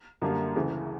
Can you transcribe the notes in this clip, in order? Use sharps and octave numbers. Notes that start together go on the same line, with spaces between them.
F#2 D3 G3 A#3
D2 C#3 E3